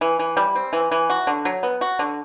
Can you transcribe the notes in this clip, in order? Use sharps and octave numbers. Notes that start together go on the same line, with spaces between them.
E3
E3
G3
C4
E3
E3
F#4
D3
F#3
B3
F#4
D3